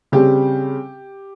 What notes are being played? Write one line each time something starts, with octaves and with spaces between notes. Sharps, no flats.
C#3 G3 C4 G4